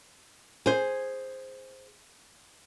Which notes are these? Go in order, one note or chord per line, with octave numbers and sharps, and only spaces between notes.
G#4 C5